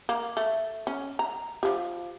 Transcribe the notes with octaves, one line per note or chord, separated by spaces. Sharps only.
A#3
A3
C#4
A#5
F3 G4